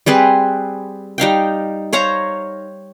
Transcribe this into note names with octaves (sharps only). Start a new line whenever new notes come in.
G3 C4 G#4 B4
G3 D#4 F5 G5
C5 C#5 F5 A#5